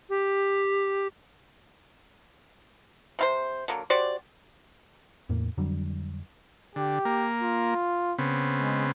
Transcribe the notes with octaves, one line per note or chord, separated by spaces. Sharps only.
G4
C3 F4 C5
D3 F#3 A#3
F#4 G4 C5 D5
E2 A2 A#3
F2 D3 F#3 G3
D3 G4
A#3
F4
C#3 B3 C4
G#3